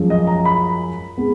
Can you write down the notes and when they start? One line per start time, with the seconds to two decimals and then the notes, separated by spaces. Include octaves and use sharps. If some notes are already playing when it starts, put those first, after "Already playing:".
Already playing: F#2 F3 G#3 C#4
0.10 D#5
0.27 A#5
0.45 B5
1.18 G#3 B3